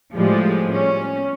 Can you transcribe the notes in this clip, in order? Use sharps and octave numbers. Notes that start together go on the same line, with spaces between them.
A2 F3 G3 G#3
C#4